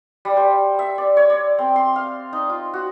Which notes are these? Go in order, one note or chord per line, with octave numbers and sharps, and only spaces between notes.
G3
C5
E5
D5
C#5
D5
C4
C6
F5
D#4
F4
F#4